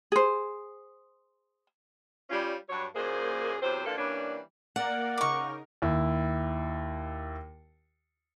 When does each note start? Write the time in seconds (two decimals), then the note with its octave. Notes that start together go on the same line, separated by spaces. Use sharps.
0.12 G#4 C5
2.30 G3 C#4 F4
2.69 G2 F#3 C#5
2.95 F#2 A#2 A#3 G#4 C5
3.62 E2 C3 F#3 C4 C5
3.86 A#2 D3 E3 A#3 D4 A4
3.98 E3 G3 A#3 C#4 D4
4.76 A#3 A#4 D5 F#5
5.18 C#3 D#4 A#4 C#6 D6
5.82 D#2 E4